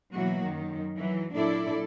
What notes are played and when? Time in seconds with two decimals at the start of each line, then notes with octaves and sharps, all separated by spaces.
0.14 B2 E3 F#3 A#3 F#4
0.44 F#2 D#3
0.96 E3 F#3
1.33 A#2 F#3 D4 E4 A4 D5